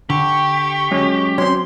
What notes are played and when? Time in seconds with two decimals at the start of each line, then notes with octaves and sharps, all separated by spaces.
0.10 D3 G4 C#6
0.91 F#3 G#3 C#4
1.38 F#3 C4 C#4 C6